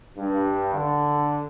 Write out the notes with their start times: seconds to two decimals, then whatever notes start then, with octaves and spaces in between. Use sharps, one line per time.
0.18 G2
0.73 D3